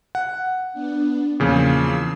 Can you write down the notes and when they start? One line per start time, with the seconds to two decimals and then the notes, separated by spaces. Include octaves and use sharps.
0.15 F#5
0.73 B3 D4
1.40 E2 A#2 C#3 F3 E6 C7